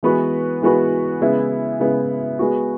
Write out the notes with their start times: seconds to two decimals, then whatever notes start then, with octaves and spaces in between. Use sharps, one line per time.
0.03 E3 G#3 B3 F#4 B4
0.62 E3 G#3 B3 F#4 B4
1.21 C#3 G#3 B3 E4
1.80 C#3 G#3 B3 E4
2.39 G#3 B3 F#4